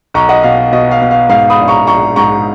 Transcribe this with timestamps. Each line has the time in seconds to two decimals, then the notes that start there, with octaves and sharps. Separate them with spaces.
0.14 B1 A#5 C#6
0.29 D#5 F#5
0.43 B2 F5
0.72 B2 D#5
0.91 F5
1.01 B2
1.11 F5
1.29 G#2 F5
1.50 B5 D#6
1.60 A#1
1.68 A#5 C#6
1.87 A#1 A#5 C#6
2.16 G#2 A#5 C#6